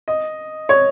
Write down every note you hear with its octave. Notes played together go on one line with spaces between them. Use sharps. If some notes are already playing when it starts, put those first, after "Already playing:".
D#5
C#5